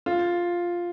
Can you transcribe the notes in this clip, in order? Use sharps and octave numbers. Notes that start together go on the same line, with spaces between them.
F4